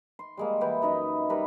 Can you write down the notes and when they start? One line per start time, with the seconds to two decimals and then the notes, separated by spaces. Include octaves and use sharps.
0.19 C6
0.37 G3 G#3 A#3
0.61 E3 B4 G5
0.81 F#2 D#4 E4 D#5
1.30 G3 A#4 B4